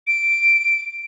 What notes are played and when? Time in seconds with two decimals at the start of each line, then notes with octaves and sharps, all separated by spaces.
0.07 D7